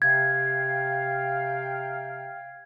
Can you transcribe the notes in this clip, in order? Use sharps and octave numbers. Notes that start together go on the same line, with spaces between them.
C3 F5 G5 G#6